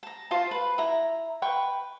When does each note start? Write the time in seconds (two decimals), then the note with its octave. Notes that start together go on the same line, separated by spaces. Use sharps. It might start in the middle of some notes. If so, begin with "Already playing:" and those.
0.03 A5 A#5
0.31 F4 C5 A5
0.51 B4
0.78 E4 A#5
1.42 B4 G5 C#6